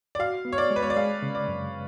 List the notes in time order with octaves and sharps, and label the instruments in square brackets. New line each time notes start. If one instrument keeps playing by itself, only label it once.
[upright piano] D5
[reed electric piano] F#4 [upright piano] F5
[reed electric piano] B3
[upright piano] C#5
D5
[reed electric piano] G#3
[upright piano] B4
C#5
D5
[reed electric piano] G#3 [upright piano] F5
[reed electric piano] C#3
[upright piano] D5
[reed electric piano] F#2